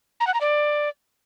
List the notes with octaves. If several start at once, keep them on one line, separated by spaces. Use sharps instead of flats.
A#5
F#5
A#5
D5